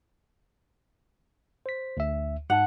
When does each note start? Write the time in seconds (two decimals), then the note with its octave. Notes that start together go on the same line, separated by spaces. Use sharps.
1.66 C5 B6
1.97 D2 E5
2.50 G#2 D#4 F#5 A5